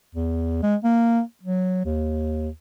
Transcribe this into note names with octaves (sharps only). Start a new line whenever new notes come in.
E2
G#3
A#3
F#3
D#2